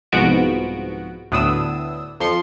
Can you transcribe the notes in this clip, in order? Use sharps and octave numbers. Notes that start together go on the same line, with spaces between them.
C2 G#2 F3 B3 F#4 D7
D2 A2 B3 D4 D#6 E6
F2 F3 C6 C#7